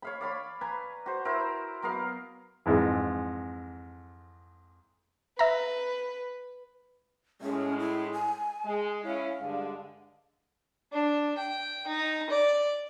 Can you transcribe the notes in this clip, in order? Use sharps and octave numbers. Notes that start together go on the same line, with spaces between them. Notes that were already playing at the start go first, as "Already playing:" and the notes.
C#5 F5 B5
D5 F5 B5 C#6
B4 G#5 A#5
F#4 C5
E4 A#4 C5 E5
F#3 B3 A#4 F5
F2 G#2 E3
B4 E5 A#5
A2 G#3 C#4
E4
G#5
G#3
C#4 E4 F5
G2 D3 G#3
D4
G5
D#4
D5